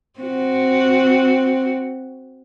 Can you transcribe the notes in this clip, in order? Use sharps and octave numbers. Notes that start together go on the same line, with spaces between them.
C4 F#4